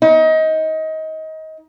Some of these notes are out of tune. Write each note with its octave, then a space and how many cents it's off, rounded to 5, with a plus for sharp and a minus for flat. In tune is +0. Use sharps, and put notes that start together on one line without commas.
D#4 +25